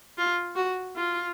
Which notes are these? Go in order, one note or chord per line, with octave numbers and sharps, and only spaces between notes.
F4
F#4
F4